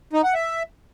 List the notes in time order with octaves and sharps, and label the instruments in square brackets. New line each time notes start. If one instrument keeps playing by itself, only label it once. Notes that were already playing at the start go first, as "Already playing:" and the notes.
[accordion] D#4
F#5
E5